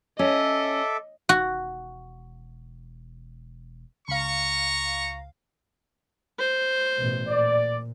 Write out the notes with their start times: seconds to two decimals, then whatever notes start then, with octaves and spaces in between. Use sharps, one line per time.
0.19 C#4 A4 D#5 E5 D6
1.29 E1 F#4
4.08 C#2 F5 A#5 C#6
6.39 C5
6.97 A1 B2
7.28 A#2 D5